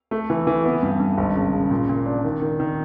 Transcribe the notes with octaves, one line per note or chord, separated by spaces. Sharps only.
A3
E3
E3
B3
G2
G2
G#1
C#3
C#3
A#2
A#2
D4
D#3
D#3
D#3